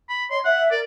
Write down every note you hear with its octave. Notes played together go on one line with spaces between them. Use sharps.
B5
C#5 D#5 C6
E5 F#5
A#4 D5